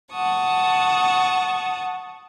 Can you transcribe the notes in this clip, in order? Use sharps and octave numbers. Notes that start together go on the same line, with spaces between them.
F#5 A5 C#6 D#6